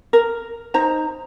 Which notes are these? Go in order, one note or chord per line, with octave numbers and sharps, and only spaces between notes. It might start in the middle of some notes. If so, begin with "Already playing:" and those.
A#4
D#4 C5 A#5